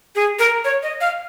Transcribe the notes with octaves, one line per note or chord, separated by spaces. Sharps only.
G#4
A#4
C#5
D#5
F5